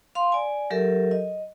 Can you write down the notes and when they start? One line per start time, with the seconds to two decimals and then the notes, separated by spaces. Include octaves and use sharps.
0.15 F5 C6
0.32 D5 G#5
0.70 F#3 G4 A4 A#4 E5
1.11 D#5